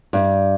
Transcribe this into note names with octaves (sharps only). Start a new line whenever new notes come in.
G2